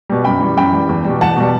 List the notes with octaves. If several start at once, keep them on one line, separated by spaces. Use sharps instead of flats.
B2 G3
F#2 G5 B5
E3 G3
F#2 G5 B5
E3 G3
E2
B2 G3
E2 F#5 A5
B2 G3